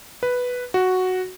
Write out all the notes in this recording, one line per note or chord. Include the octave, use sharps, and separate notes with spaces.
B4
F#4